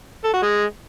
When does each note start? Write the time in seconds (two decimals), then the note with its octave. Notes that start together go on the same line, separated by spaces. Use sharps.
0.24 A4
0.33 F#4
0.42 G#3